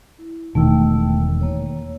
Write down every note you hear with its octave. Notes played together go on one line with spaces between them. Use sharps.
E4
E1 D#3 A3 G5 E6
A#3 C#5